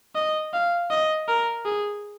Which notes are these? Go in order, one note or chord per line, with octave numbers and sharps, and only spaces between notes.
D#5
F5
D#5
A#4
G#4